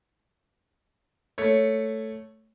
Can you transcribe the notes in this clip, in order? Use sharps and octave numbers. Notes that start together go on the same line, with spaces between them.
A3 C#5